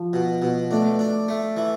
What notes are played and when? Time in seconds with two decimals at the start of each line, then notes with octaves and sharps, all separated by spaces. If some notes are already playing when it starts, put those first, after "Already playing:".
Already playing: F3
0.13 B2
0.42 B2
0.71 A3 D4
0.99 D4
1.29 A3
1.57 E3